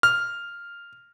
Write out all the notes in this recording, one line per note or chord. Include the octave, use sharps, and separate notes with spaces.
F6